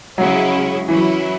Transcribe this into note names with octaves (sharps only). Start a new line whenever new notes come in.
C#3 F#3 G#3 C#4 E4
E3 F#3 C#4 E4